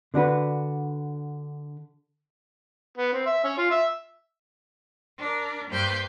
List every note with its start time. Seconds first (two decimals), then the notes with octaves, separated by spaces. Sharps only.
0.14 D3 D4 F#4 B4
2.97 B3
3.13 C4
3.26 E5
3.44 C#4
3.58 F4
3.71 E5
5.17 D4 A#4
5.69 G2 A#3 B4 C5 G5 C6